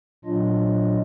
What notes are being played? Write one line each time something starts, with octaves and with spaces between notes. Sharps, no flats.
A#2 F#3 D4 F4 D#5